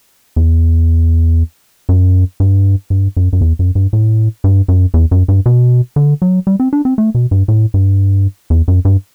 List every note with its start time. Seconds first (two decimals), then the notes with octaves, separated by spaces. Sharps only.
0.36 E2
1.89 F#2
2.40 G2
2.90 G2
3.17 F#2
3.33 F#2
3.41 E2
3.59 F#2
3.75 G2
3.93 A2
4.44 G2
4.68 F#2
4.94 E2
5.11 F#2
5.28 G2
5.46 B2
5.96 D3
6.22 F#3
6.47 G3
6.60 C4
6.73 D4
6.85 C4
6.98 A3
7.15 B2
7.31 G2
7.48 A2
7.74 G2
8.50 E2
8.68 F#2
8.85 G2